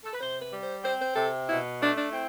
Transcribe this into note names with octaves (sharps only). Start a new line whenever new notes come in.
A4
B4
C3 C5
B4
G3
C5
C4 C5
C5
C3 A4
B2 E4
A3 D4
D4
C4 E4